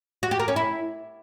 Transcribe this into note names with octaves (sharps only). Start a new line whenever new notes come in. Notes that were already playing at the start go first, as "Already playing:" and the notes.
F#4
G4
A#4
C#4
E4